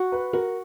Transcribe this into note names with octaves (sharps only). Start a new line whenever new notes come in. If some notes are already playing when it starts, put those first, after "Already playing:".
Already playing: F#4
B4
F#4 A#4